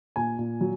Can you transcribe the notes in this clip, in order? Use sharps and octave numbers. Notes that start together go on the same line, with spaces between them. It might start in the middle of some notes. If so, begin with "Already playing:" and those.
A#2 G#5
A#2
F#3